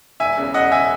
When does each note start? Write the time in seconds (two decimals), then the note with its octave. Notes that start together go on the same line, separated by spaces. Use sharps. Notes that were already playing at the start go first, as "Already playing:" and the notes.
0.20 E1 E5 G#5
0.37 E2 C#3
0.54 E1 D#5 F#5
0.72 C#3 E5 G#5